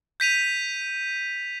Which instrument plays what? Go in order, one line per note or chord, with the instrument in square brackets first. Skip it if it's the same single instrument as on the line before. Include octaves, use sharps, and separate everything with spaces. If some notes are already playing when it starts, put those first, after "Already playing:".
[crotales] G6 B6 D#7 F7